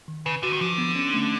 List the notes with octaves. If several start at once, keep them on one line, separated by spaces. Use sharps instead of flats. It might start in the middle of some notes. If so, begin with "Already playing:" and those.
D#3
C#3 B4
D3 F#4
D#3
D3 F3
B3
C#4
A3